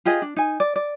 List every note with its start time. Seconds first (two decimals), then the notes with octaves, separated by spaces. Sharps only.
0.05 F4 G4 G#4 D#5
0.22 D4
0.36 D#4 G#5
0.60 D5
0.76 D5